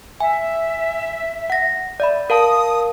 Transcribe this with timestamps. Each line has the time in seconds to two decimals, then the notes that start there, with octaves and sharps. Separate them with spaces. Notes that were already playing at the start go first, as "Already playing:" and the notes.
0.20 E5 G#5
1.50 F#5 A#6
2.00 D5 E5 B5
2.30 A#4 F5 A5 D#6